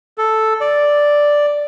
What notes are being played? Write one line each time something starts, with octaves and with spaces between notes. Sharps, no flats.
A4
D5